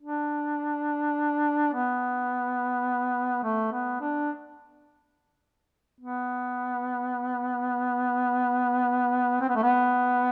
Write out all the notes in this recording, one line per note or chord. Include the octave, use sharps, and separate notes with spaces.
D4
B3
A3
B3
D4
B3
C4
B3
A3
B3